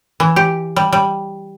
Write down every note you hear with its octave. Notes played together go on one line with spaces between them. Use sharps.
E3
G4
G3
G3